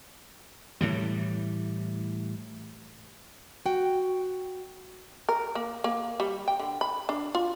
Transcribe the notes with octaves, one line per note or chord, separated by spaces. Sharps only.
A2 E3 G3
F#4 G5
A#4
A#3
A#3
G3
G5
D3
B5
D4
F4